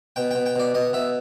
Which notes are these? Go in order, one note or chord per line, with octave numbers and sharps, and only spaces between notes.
B2 G5
B2 G5
G5
B2 D5
B2 D#5
B2 E5